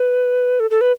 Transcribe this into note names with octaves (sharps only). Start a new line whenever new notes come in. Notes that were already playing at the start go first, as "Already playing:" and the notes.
Already playing: B4
A4
A4
B4